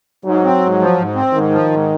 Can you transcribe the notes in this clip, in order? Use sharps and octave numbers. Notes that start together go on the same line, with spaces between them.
G#2 F#3
C4
G#2
F3
G#2
C4
G#2 D#3
F3
G#2